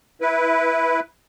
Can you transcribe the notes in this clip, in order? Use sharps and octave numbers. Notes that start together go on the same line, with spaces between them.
E4 B4